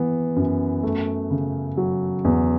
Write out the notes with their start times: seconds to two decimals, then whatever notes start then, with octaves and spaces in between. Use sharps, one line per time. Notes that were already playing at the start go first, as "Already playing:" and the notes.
Already playing: E3 B3
0.36 F#2
0.83 A3
1.30 C#3
1.77 F#3
2.25 E2